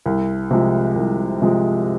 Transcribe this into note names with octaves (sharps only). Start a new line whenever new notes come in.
C2
C3 F3 G#3
C2
C3 F3 G#3